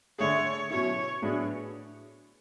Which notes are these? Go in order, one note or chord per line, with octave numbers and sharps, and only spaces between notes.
D3 A3 D4 G#4 C#5
B2 F#3 C#4 E4 C#5
A2 F#3 B3 D4 G#4